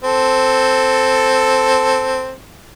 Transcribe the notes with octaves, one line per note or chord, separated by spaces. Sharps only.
C4 A4